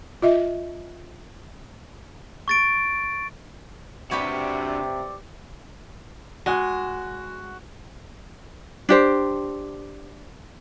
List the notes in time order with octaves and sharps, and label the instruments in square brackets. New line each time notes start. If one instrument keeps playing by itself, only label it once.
[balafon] F4 D#5 E5
[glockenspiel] C#6 A6 D7
[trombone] C3 [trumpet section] C4 D5 [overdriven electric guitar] D4 F#4 [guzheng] G4 B4 C#5
[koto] G#3 [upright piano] F#4
[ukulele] D4 G4 C5